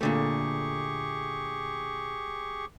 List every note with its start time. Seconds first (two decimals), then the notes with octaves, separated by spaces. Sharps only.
0.01 A#2 D3 A3 G4 G#4 C#6